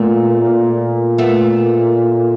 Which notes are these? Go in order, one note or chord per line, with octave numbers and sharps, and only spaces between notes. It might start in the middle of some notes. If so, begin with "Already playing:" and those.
Already playing: A#2 A3 B3
A#2
A3 B3